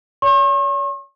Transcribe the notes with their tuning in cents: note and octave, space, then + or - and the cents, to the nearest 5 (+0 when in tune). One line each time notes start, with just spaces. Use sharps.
C#5 +45 C#6 -45